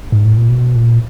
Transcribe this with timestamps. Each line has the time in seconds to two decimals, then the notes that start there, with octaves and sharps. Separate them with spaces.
0.12 G#2
0.25 A2
0.38 A#2
0.50 B2
0.76 A#2